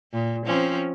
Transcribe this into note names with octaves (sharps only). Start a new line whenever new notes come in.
A#2
F3 C4 C#4